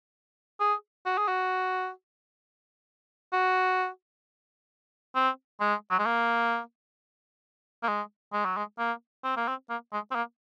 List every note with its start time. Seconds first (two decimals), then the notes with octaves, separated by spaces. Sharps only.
0.60 G#4
1.06 F#4
1.18 G#4
1.28 F#4
3.33 F#4
5.15 C4
5.60 G#3
5.91 F#3
5.99 G#3
6.06 A#3
7.83 A#3
7.88 G#3
8.33 G#3
8.45 F#3
8.57 G#3
8.78 A#3
9.24 C4
9.37 A#3
9.48 C4
9.70 A#3
9.92 G#3
10.11 C4
10.15 A#3